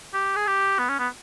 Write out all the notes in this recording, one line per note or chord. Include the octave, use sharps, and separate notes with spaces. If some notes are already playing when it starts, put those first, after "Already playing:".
G4
G#4
G4
B3
C#4
B3